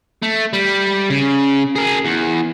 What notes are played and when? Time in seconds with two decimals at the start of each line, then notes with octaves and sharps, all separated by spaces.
0.22 A3
0.53 G3
1.10 C#3
1.76 G#4 A#4
2.04 E2